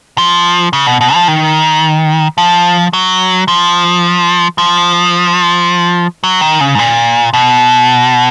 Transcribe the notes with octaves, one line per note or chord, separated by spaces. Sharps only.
F3
C#3
B2
B2
F3
D#3
F3
F#3
F3
F3
F#3
D#3
C#3
G#2
A#2
B2